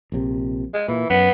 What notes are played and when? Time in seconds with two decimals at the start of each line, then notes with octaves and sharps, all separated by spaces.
0.12 A#1 C3
0.74 G#3
0.88 A#2 E3
1.10 F#2 B3